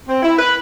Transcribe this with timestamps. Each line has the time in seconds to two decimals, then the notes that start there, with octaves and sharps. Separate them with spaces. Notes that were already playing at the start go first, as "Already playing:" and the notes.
0.08 C4
0.23 E4
0.39 B4